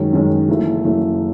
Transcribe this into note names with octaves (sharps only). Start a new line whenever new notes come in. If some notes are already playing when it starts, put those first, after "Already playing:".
Already playing: F#2 D#3 G#3 C#4
F#2 D#3 G#3 C#4
F#1 F#2 E3 A3
F#1 F#2 E3 A3